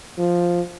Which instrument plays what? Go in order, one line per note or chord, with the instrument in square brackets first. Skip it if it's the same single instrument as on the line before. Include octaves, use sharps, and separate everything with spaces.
[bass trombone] F3